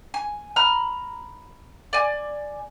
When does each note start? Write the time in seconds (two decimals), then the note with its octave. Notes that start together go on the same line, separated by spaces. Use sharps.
0.14 G#5
0.56 A#5 B5 F6
1.93 D5 G#5